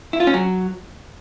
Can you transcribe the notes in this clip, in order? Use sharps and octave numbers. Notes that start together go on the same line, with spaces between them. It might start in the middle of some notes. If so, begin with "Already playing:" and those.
E4
F4
C#4
F#3